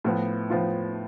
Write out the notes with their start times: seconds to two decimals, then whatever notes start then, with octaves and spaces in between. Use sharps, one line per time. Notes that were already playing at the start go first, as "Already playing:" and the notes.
0.04 A2 F3 B3 F4
0.50 A2 F3 B3 F4